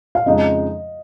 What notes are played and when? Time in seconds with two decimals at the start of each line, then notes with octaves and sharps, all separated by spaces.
0.15 F5
0.26 F2 C#3 F3 G#3 D#4 D#5